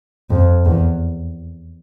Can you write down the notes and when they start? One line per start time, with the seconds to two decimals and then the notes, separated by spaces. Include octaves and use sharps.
0.30 F2
0.66 E2